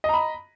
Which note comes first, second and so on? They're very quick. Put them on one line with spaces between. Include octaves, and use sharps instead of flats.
D#5 A#5 B5